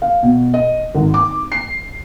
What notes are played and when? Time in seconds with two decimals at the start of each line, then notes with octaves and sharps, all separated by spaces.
0.02 F5
0.23 B2
0.54 D#5
0.95 G#1
1.14 D6
1.52 C7